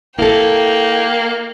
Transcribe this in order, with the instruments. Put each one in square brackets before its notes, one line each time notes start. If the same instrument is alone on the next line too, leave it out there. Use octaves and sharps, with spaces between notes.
[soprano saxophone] A#3 [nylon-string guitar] E4 A4 [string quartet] G5